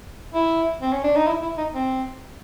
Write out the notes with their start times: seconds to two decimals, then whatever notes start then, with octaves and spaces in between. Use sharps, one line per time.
0.34 E4
0.82 C4
0.92 C#4
1.04 D4
1.15 D#4
1.27 E4
1.42 E4
1.57 D#4
1.74 C4